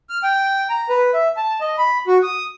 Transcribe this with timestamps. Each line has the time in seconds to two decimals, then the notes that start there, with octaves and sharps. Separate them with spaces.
0.09 F6
0.23 G5
0.70 A#5
0.89 B4
1.14 E5
1.37 A5
1.61 D#5
1.78 B5
2.07 F#4
2.23 D#6